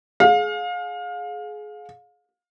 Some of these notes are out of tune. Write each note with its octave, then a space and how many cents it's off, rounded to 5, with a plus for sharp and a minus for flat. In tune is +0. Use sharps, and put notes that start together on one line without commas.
G#4 +25 F5 +30